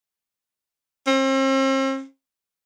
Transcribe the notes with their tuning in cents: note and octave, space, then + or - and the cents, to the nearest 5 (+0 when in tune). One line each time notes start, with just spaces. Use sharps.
C4 +40